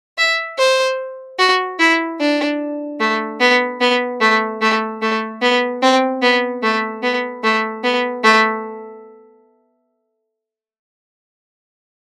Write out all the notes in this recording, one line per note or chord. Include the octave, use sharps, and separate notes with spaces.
E5
C5
F#4
E4
D4
A3
B3
B3
A3
A3
A3
B3
C4
B3
A3
B3
A3
B3
A3